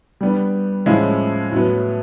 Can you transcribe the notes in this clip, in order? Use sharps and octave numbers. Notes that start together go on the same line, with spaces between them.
G3 B3 D4
A2 F3 G#3 C#4 E4
A2 F#3 B3